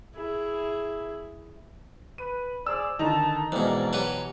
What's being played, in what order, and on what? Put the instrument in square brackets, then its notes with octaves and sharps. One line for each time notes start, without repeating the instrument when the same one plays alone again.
[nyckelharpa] E4 G#4
[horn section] B4 [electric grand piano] D#7
[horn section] G#4 C5 D5 [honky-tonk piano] E6
[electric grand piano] D3 D#3 [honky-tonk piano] D#4 [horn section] A5
[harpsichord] F2 G#2 [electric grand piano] B2 E3 [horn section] A4 A#4 D5
[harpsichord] F#3 G4 B4